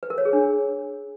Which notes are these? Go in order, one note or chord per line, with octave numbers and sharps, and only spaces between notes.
B4
A#4
C#5
G#4
D4